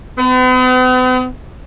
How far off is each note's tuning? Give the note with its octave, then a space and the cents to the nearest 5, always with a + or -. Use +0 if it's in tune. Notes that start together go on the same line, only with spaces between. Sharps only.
B3 +45